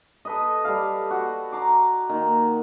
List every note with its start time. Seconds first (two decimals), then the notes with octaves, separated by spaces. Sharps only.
0.25 A4 B4 D#5
0.64 G3 A4 F5
1.10 F#4
1.52 A#5 C6 D6
2.09 D#3 A#3